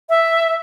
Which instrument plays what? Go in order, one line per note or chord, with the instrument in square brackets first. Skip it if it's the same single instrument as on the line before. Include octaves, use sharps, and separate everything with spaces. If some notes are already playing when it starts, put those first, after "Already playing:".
[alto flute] E5